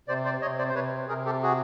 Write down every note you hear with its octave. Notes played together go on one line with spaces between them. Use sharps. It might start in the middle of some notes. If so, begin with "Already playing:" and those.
C3 C5 D5
C5 D5
C3 C#5 D#5
C5 D5
C5
C3 B4 C#5
C3 G#4 A#4
G4 A4
F#4 G#4